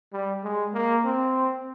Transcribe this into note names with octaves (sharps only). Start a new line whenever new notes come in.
G3
G#3
A#3
C4